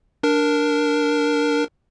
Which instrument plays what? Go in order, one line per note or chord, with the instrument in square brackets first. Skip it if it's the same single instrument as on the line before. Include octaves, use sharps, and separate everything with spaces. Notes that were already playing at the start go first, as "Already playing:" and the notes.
[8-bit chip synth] D4 A#4